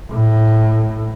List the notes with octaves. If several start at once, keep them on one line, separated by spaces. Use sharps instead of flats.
A2